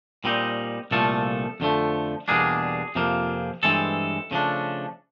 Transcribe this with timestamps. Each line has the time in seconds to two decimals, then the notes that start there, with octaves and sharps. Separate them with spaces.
0.24 A#2 G3 C4 D#4
0.91 C2 A#2 F3 A3 A4
1.60 F2 D3 F3 A3
2.28 E2 B2 G3 A#3 D4 G#4
2.95 F2 C3 F3 A#3
3.63 G2 E3 G#3 C4 A4
4.31 C#3 F3 A3 D4